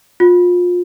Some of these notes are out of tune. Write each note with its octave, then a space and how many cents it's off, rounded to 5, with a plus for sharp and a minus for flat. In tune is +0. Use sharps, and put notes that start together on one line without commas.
F4 +30